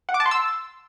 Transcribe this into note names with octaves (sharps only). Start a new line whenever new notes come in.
F#5
D6
A5
C6
E6